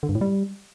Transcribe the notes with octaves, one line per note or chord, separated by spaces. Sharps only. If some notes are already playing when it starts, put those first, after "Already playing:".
D3
G2
A2
G3